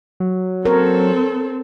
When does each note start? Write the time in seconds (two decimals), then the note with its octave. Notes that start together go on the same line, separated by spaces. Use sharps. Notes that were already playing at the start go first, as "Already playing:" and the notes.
0.20 F#3
0.65 C4 A4 A#4 C#5